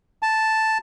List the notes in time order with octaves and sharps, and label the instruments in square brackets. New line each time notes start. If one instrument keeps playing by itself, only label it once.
[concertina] A5